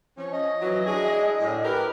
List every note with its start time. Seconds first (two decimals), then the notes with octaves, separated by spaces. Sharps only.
0.17 F3 C#4
0.31 D#5
0.61 E3 F#3
0.86 D4 E4 G#4
1.40 A2 D3
1.63 G4 A#4 B4